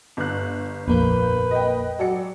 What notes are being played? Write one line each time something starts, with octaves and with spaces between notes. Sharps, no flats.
G1 F#6
A#1 F2 A#3 B4 G6
D#5 G5
F#3 G#4 A4 D5 C#7